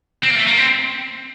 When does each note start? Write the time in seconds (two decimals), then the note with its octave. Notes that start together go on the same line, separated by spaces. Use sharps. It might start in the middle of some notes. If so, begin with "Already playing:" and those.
0.23 C4
0.30 A#3
0.35 A3
0.47 A#3
0.57 C4